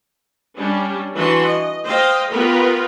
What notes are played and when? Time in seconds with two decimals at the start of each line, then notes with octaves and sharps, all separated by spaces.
0.57 G3 C#4 D4
1.15 E3 D4 F#4 B4 C6
1.46 D#5
1.86 C5 D#5 F5 G5
2.32 B3 F4 G4 A#4 B4